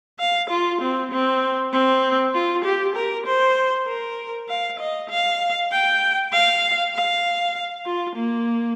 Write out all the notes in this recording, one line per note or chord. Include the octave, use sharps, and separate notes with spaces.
F5
F4
C4
C4
C4
F4
G4
A#4
C5
A#4
F5
D#5
F5
G5
F5
F5
F4
A#3